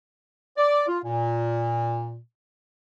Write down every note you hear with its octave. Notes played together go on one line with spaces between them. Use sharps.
D5
F4
A#2